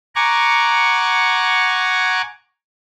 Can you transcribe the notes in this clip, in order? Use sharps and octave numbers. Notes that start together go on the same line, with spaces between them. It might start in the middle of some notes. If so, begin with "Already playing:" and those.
F#5 G#5 A#5 C#6 D6